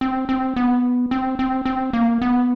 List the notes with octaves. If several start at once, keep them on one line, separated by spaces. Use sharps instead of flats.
C4
C4
B3
C4
C4
C4
A#3
B3